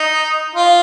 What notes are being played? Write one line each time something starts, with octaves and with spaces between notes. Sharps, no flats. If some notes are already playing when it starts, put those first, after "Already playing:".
Already playing: D#4
F4